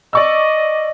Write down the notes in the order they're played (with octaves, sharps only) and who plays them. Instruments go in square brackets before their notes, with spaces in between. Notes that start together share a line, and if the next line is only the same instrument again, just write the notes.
[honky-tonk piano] D5 C#6 E6 [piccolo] D#5